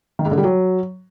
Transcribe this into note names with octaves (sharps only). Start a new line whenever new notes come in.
D#3
G#2
D3
G3
F#3